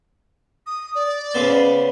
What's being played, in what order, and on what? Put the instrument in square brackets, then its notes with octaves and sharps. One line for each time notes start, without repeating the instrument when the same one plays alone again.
[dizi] D#6
D5
[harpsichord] C#3 B3 C5